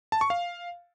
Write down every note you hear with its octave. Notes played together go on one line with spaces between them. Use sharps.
A5
C#6
F5